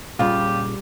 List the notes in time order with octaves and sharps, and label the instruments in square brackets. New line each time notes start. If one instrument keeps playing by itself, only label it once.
[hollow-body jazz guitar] A#2 C#3 [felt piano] G3 [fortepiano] F4 [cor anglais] G4